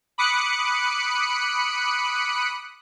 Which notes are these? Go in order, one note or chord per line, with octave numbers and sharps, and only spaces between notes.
B5 D6 D#6 F#6 C#7